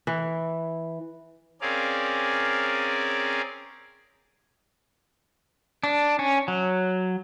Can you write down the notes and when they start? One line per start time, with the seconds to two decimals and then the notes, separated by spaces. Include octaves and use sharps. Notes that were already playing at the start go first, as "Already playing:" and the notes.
0.07 E3
1.61 C4 C#4 G#4 A#4 D5 F5
5.84 D4
6.19 C#4
6.48 F#3